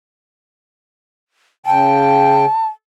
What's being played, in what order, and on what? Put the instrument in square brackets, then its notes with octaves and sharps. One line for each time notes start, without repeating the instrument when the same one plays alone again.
[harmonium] C#3 G5 [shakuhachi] A5